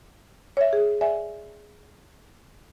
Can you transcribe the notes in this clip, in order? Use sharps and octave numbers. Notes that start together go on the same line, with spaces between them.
C#5 E5
G#4
D5 E5 G#5